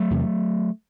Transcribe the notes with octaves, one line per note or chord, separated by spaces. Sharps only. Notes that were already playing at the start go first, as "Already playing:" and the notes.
Already playing: F#3 A3
E2 C3